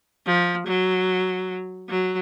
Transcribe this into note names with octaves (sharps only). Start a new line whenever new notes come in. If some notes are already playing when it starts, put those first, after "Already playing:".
F3
F#3
F#3